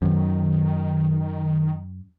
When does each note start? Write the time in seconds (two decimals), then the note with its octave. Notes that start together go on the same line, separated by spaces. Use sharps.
0.02 F#2 D#3